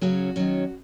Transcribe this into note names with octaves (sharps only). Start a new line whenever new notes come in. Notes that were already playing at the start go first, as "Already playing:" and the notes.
C#3 F#3 C#4 F#4
D#3 F#3 C#4